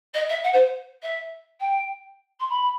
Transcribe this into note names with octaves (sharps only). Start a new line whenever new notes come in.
D#5
E5
F#5
C5
E5
G5
C6
B5